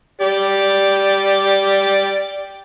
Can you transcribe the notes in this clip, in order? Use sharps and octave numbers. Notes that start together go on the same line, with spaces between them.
G4 D5